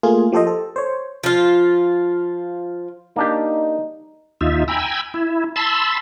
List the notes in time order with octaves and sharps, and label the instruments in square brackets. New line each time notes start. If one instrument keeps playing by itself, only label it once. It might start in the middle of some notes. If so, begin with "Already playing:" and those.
[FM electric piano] A3 A#3 F4 G#4
F3 G4 A4 C5 D#5
A4
C5 C#5
[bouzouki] F3 F4
[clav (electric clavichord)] A#3 D4 G4 [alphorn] D#4
[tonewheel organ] D#2 D#4 F4 E5
G5 G#5 A#5 B5 E6
E4
A5 B5 C6 E6